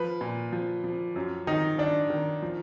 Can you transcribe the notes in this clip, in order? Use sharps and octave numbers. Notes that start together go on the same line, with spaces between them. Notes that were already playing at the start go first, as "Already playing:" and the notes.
Already playing: F3 B4
A#2
F3
F3
F#2
D#3 D#4
D#3 D4
D#3
F3